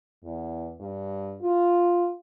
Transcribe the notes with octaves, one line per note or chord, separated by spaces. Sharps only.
E2
G2
F4